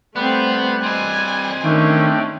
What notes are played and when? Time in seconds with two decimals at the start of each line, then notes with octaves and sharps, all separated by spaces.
0.16 G3 A3 B3 C4 F#6
0.83 C4 D#5 G#5
1.64 D#3 A3 C#4 D4 G5